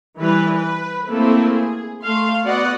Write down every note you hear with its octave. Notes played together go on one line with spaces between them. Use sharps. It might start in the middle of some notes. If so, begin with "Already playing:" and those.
E3 G3 B4
B4
A3 A#3 C4 E4 A4
G#4
A3 A4 F5 C6
B3 F#4 D5 D#5 F#5